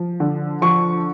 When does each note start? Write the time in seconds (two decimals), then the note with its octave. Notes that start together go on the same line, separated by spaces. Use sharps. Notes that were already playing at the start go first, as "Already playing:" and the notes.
Already playing: F3
0.20 D3
0.62 F3 C#6